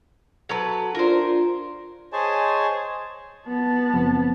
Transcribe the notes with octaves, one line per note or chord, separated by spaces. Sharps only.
F#3 A4 B4
D4 F4 A#4 C5
G#4 C5 C#5 D#5 G#5 A5
B3 A5
F#1 F2